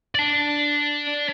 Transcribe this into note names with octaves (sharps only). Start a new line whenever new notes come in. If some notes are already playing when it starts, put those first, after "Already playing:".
D5 A5